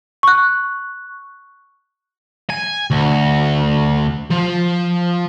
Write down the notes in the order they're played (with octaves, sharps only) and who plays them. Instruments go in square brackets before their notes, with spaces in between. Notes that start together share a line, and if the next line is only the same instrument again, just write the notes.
[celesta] C#6 F#6
[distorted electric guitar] G#5
D2
F3